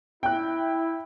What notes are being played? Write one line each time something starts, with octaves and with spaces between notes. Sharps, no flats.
E4 G5 F#6